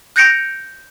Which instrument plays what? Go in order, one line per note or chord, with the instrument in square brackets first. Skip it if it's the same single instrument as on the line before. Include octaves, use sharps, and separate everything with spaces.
[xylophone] F#6 G6 A#6 C#7 D7 F7